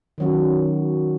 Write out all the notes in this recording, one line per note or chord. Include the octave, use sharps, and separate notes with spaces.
D#3 F#3 C#4 F#4